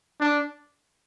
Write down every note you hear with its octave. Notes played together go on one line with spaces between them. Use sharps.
D4